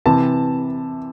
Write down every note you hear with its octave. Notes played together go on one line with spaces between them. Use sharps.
C3 E3 A5